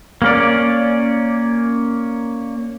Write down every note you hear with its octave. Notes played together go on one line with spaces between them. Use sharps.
A#3 C#4 D5